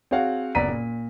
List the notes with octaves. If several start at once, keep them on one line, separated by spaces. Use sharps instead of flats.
C4 F#4 G#4 C#5 F5 F#5
F#1 B3 D5 A#5 B6 D#7
A#2